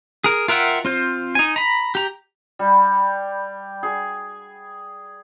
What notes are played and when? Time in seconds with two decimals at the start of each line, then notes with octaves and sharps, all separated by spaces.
0.24 G#4 A#4
0.48 F4 A#4 E5 F#5 G5
0.85 C4 F4 C5
1.35 D#4 G#5
1.56 A#5 B5
1.95 G4 A#5
2.59 G3
3.83 G#4